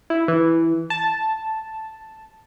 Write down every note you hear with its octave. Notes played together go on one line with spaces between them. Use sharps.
E4
E3
A5